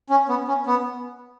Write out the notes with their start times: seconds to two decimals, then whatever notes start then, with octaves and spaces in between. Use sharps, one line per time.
0.10 C#4
0.29 B3
0.48 C#4
0.67 B3